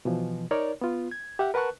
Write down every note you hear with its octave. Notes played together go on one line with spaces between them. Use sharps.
B2 E3 F3
D#4 A#4 C#5 D5
B3 F4
G#6
G4 E5 F#5
A#4 B4 F#5 A5 C#6 F#6